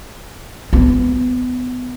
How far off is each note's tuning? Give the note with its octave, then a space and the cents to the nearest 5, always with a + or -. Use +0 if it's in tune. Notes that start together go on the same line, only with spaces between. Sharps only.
B3 +20